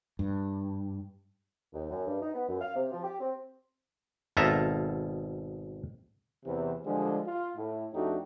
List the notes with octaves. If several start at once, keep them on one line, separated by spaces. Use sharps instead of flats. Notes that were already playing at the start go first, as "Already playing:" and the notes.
G2
D#2
F#2
G2
D#4
B3
F#2
F5
C3
F3
G4
C4
G#1 B2 F4 A4 E5 A#5
E2 C3 E3
D3 F3 G3 G#3
F4
A2
F2 A3 D4 D#4 F#4 G4